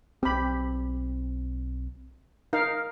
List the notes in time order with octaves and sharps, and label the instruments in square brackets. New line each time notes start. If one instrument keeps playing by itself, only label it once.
[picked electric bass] B1 C4 [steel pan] G4 B5
[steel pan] D#4 A#4 F5